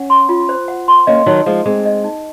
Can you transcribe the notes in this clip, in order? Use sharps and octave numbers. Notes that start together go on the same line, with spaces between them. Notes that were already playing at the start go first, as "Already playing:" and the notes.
Already playing: C#4 F#5
C6
F4
C5
F#5
C6
A#3 C#4 D#5
D#3 F#3 D#4
F3 G#3 D#4
G#3 C4 G#4
D#5
D#4